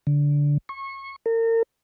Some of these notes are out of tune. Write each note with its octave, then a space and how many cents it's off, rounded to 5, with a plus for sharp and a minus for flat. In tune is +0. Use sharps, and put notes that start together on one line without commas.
D3 -15
C#6 -25
A#4 -40